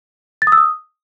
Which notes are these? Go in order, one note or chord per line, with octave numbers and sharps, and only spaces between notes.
A6
D#6
E6
D#6